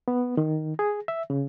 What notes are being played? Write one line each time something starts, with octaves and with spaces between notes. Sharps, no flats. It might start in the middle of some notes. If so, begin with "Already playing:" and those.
B3
D#3
G#4
E5
C#3